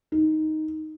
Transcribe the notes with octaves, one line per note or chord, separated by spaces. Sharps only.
D#4